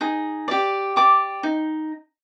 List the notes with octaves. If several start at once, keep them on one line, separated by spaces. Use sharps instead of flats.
D#4 G#4
G4 D5
G4 D5 D6
D#4